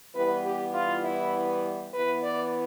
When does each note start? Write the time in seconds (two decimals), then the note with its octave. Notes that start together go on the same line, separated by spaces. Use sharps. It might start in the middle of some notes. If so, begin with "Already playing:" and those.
0.14 E3 G3 B3 B4
0.43 G4
0.74 F4
1.03 E4
1.93 E3 B3 B4
2.22 D5